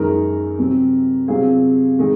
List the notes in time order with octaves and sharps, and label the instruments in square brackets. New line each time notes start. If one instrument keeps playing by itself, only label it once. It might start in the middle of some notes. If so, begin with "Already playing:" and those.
Already playing: [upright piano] F#2 D#3 G#3 D#4 A#4
C3 F#3 C4
C3 F#3 C4 F4 G#4
D#3 G#3 D#4